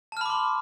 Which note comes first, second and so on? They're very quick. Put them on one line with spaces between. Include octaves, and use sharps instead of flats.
A5 F6 B5 D6 C6